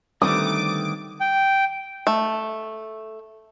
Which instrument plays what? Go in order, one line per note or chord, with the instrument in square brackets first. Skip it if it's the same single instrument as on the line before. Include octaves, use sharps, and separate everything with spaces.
[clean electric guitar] D3 D#3 A3 [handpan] G3 C4 B4 [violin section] D6 [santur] D#6
[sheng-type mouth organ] G5
[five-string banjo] A3